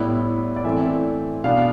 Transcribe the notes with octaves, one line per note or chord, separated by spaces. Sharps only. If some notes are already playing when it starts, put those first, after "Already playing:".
Already playing: A2 G3 B3 E4
D5
E3 A3 C4 E5
B2 B3 D4 F5